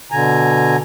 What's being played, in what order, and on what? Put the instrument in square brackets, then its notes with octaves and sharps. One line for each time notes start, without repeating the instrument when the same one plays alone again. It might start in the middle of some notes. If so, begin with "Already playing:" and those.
[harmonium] B2 D3 G#5 A#5